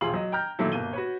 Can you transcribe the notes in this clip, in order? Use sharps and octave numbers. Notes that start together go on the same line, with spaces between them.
E1 A#1 F4 G#4 C6 F#7
F#3 D#5
G5 A#5 F6 G6
A#2 D#3 F#3 A3 E4 A4
G1 B2 A#3 D#7 G7
F#4 B4 C#5